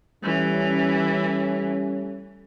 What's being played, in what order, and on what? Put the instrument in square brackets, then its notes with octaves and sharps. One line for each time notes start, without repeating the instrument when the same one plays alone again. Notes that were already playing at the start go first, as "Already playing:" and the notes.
[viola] E3 [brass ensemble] G3 A3 C#4